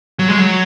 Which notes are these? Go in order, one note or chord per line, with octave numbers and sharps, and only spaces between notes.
F#3
G#3
F#3